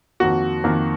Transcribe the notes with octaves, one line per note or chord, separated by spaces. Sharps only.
F2 D#3 A#3 F#4
F2 D#3 A#3